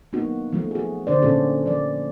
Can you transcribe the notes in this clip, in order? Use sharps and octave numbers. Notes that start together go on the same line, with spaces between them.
A#3 B3 D#4 F#4
F3 A3 F#4
F#4 G#4
D3 D4 C5 D5
A#2 A3 C#4 F#4 A4
F3 A#3 D5